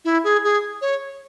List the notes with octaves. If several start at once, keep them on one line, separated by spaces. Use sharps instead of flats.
E4
G#4
G#4
C#5